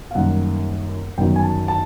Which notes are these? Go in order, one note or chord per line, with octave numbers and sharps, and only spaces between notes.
F5
F#2 D#3 G3 A#3 F#5
G1 F#2 D#3 F#3 G5
G#5
A5
A5